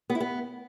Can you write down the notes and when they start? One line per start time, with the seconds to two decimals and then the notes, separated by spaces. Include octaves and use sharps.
0.10 B3
0.15 E4
0.20 B3